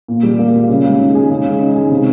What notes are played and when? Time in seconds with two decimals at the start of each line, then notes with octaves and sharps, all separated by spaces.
0.08 A#2
0.23 G3
0.39 A#3
0.55 F4
0.69 C#3
0.85 G#3
0.99 D#4
1.15 G#4
1.30 C#3
1.45 G#3
1.60 D#4
1.75 G#4
1.90 C3